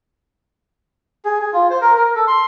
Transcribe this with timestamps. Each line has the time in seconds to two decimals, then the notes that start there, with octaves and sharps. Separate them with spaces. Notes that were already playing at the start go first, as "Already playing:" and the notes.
1.25 G#4
1.41 G#4
1.53 F4
1.70 C5
1.82 A#4
1.97 A#4
2.15 A4
2.27 C6